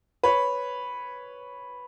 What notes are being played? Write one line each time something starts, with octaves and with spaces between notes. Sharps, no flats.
B4 C#5